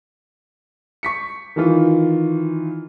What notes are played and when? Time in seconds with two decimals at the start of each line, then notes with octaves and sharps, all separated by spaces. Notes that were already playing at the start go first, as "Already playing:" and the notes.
1.03 C#6 B6 C#7
1.56 D#3 E3 F4